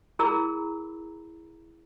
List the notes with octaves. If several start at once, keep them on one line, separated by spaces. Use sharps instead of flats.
E4 G#4 A#4 A#5 B5 E6